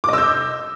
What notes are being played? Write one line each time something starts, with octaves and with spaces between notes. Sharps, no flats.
D#5 D6 E6 G6